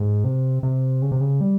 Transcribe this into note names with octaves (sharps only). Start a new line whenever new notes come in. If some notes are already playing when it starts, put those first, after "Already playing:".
Already playing: G#2
C3
C3
C#3
C3
C#3
G3